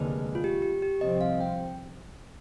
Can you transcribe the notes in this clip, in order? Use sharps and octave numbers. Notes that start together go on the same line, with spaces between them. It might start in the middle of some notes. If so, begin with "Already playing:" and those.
Already playing: F1 D#2 D3 G#3 B4
F4
G4
G4
G4
C2 C3 F3 C4 D#5
F5
G5